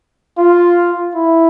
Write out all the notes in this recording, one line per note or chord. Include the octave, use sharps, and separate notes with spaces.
F4
E4